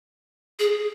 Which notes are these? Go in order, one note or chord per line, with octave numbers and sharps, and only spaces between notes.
G#4